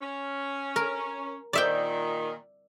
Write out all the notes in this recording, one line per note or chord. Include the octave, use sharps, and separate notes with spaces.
C#4
A#4
A#2 D#3 D5 E5 G5